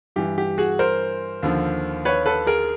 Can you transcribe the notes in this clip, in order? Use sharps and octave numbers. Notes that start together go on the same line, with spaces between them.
G2 E3 G4
G4
F#4 G#4
A#4 C5
D#2 D3 F3
B4 C#5
A4 B4
G#4 A#4